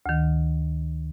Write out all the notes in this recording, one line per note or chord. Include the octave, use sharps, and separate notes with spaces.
D2 D#3